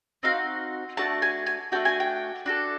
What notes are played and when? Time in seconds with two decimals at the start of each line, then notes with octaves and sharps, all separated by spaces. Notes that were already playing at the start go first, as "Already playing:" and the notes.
0.23 C4 D#4 F#4 F5
0.97 A3 D4 F#4 A5
1.22 G#5
1.46 G#5
1.72 A3 D4 F#4 G5
1.85 G#5
2.00 G5
2.46 D4 F#4 A4